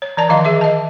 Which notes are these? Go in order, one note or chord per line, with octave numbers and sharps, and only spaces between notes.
C#5
E3 D5 A5
D#3 F3 D#5 F5 C6
G#4 E5 D6
D#5 A5